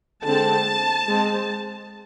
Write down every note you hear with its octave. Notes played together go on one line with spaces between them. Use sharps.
D3 G#3 C4 A5
G#3 C4